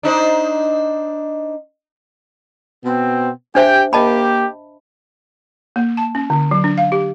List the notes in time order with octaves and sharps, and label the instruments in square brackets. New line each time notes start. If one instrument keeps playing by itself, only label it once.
[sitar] D4 D#4 C5
[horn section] B2 B3 C4
[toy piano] D4 C5 E5 [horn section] G4 G5
[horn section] A#3 G4 [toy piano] D#5 A5 B5
[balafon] A#3
A5
C#4
D3
F#3
D4
F5
G4